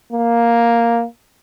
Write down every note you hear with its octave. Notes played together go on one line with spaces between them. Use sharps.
A#3